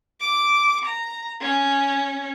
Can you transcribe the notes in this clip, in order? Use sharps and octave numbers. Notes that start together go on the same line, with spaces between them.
D6
A#5
C#4